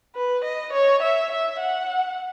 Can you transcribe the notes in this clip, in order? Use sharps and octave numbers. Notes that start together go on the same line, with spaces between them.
B4
D#5
C#5
E5
E5
F#5